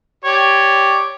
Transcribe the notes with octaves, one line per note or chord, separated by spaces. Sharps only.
G4 C#5 D5